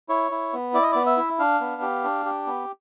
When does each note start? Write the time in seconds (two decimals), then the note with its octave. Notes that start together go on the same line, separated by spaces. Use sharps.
0.09 E4 C#5
0.31 E4
0.53 B3
0.74 E4 D5
0.83 D#5
0.92 B3 D5
1.06 E5
1.17 E4
1.39 D4 F5
1.60 B3
1.82 G4
2.04 D4
2.25 G4
2.47 B3